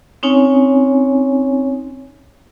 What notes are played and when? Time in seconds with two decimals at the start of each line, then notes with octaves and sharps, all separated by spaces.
0.23 C4 C#4 D#4 C#5 G#5